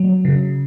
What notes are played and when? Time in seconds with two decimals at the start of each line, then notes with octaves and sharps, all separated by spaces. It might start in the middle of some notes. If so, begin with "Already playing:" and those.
Already playing: F#3
0.25 C#3